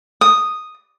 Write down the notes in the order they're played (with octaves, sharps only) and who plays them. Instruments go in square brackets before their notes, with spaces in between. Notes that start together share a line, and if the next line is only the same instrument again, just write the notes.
[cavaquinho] D#6